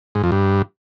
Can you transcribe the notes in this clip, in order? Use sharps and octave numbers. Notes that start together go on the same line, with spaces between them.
G#2
F2
G2